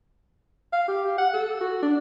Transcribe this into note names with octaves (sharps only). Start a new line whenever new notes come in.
F5
G4
F#5
A4
F#4
D4